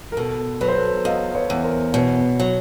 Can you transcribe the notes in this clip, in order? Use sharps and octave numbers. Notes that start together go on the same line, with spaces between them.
A#4
B2 A4
F#3 B4
C5
A4 B4
E2 D#5 F5
B4 C#5
E2
A#4 C5
B2 B4 C#5
F#3